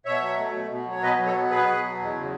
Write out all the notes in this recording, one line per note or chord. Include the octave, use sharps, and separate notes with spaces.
B2 C#5 E5
F#3
A3
B2
B2
F#3 C#5
B2 B4 D#5
F#3
A4 C#5
B3
B2 G#4 B4
B2
F#3
E2
C#3